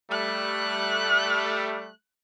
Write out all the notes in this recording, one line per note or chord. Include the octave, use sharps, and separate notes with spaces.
G3 A3 F#6